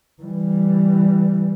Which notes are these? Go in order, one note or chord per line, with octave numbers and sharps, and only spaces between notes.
E3 G3